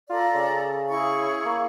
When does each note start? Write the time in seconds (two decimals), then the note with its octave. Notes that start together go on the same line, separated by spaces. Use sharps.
0.10 F4 A4 D5 A#5
0.35 C#3
0.90 E4 G#4 C#6
1.45 A#3